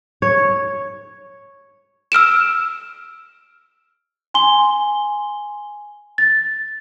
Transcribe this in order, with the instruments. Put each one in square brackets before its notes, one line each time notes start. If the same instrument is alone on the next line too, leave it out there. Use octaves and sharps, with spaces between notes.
[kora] C#5
[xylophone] E6 F6 D7 E7
[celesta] G#5 C6 G7
A6